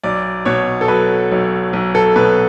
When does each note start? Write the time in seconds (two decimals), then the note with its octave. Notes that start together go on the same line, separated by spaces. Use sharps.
0.04 B1 D5
0.45 B2 C#5
0.81 A4
0.88 F#3 B4
1.32 B1
1.73 B1
1.95 A4
2.16 B2 B4